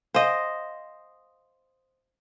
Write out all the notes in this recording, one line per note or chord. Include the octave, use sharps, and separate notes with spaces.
C5 D#5 F5 F#5 G#5